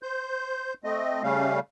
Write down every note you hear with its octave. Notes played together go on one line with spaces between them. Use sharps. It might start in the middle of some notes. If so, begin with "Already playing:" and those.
C5 G6
A3 C4 D#5
C#3 G3 A3 C#4 F5